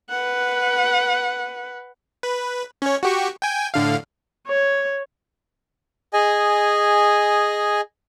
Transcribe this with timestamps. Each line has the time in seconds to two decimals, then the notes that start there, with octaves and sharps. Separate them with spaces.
0.10 B4 F#5
2.23 B4
2.82 C#4 C#5
3.03 F#4 G4 C#6
3.42 G5 G#5
3.74 A2 D3 F5
4.48 C#5
6.13 G#4 D#5 G#5